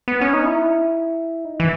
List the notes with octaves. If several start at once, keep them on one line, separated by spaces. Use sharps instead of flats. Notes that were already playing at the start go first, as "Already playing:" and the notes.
B3
C#4
D#4
E4
D#4
E3